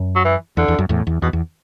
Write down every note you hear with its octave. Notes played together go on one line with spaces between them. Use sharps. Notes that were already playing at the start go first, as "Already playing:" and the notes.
Already playing: F#2
F#3
E3
E2 D3
E2
F#2
E2 A2
E2
E2 B2
E2